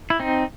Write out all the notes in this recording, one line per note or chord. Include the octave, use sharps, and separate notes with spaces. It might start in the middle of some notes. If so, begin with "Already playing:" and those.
E4
C4 D#4